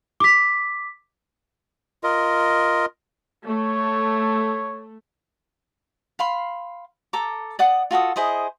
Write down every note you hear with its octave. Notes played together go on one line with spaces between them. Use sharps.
D6 B6
F4 A#4 D#5
A3 C#5
F5 B5 C6
A4 A#5 D6
D5 F#5 D#6
F4 F#4 A4 D#6
E4 G#4 C5 D#5